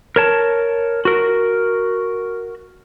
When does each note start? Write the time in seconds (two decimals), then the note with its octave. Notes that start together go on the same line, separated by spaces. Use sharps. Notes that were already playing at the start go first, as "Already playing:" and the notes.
0.16 A#4 C#5 A5
1.05 F#4 A#4